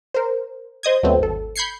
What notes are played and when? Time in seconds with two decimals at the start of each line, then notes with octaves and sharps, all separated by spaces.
0.14 A#4 C5
0.83 C5 D#5 D#6 G#6
1.03 D#2 F#3 A3 B3 C4
1.19 G#1 A4
1.56 B5 G6 G#6 C7 C#7